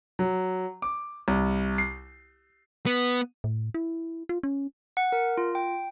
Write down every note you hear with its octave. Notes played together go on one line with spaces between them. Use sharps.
F#3
D6
C2
C7
B3
A2
E4
F4
C#4
F#5
A#4
F4
G5